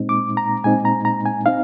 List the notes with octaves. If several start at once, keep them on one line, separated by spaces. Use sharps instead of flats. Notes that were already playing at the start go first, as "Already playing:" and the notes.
Already playing: A#2 G#3 C4 D#4
D6
A#5
A#2 G#3 C4 D#4 G#5
A#5
A#5
G#5
C4 D#4 F5